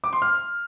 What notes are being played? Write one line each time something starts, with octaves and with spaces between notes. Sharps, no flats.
D6
C6
F6